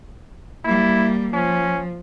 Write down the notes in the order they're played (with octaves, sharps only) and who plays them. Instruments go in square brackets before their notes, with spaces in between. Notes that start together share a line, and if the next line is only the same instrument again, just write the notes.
[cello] G3 A#3 [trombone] E4
[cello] F3 [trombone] C#4